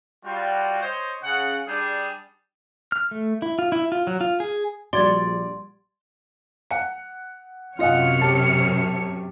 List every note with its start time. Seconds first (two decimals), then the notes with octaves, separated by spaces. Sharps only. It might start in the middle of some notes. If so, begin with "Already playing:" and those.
0.25 G3 F4 F#4
0.82 C5 C#5 D#5
1.23 C#3 F#5
1.68 G3 D4 G#4
2.92 F6
3.11 A3
3.42 E4
3.59 F4
3.72 E4
3.92 F4
4.07 F#3
4.21 F4
4.40 G#4
4.93 A#1 G3 F#4 D5 C6 G#6 A6
6.71 F#5 C#7
7.79 F#2 C3 F4 C#5 D#5 F#5 F6 C#7
8.21 G4 A5